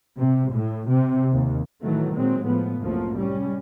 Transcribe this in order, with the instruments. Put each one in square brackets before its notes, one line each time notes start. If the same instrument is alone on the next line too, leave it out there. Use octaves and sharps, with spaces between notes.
[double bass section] C3
A2
C3
D#2
A2 D#3 E3 F#3 A3
A#2 F#3 G#3 C4
A2 F3 B3
C2 F#2 A2 F3 A#3
G3 C#4